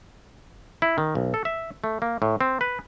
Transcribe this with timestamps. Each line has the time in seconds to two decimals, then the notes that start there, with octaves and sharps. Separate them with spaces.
0.82 E4
0.98 D#3
1.15 B1
1.34 A4
1.45 E5
1.84 A3
2.02 A#3
2.22 A2
2.41 C4
2.61 B4